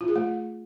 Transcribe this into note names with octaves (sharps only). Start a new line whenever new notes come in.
F4
G#4
A3